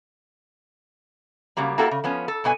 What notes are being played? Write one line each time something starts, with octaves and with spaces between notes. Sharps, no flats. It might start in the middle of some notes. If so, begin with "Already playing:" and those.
C#3 F#3 G3 A#3
A#3 E4 F#4 G4 A4 A5
C#3
F3 B3 C#4
A4
G2 B2 B3 G#5